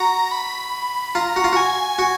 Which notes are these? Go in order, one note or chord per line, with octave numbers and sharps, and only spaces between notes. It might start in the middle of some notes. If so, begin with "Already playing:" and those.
Already playing: F#4 A#5
B5
F4 A#5
F#4
F4
F#4 G#5
F#4